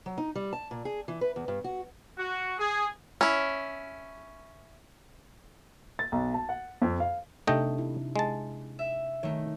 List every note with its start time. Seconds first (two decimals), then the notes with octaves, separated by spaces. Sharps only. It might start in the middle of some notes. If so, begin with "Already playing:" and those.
0.06 F#3
0.18 D#4
0.35 G3
0.53 A5
0.71 A#2
0.85 G#4
1.08 E3
1.21 B4
1.36 E2
1.48 G2
1.64 F#4
2.18 F#4
2.58 G#4
3.21 C#4 E4
5.99 A6
6.12 B1
6.34 A5
6.49 F#5
6.82 F2
7.00 F5
7.47 C3 A3 D4 D#4 D#5 G5
7.78 E4
8.16 G#3 A5
8.79 E5
9.23 D#3 A3 C#5